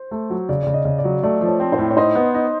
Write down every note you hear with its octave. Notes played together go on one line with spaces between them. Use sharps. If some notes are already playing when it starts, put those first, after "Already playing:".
Already playing: C5
A3
F#3
C#3 D5
C#3 D5
D#5
C#3
D5
F#3
A3 D5
F3
C#5
C4
C5
A2
C#5
D#4 C5
B3
D#4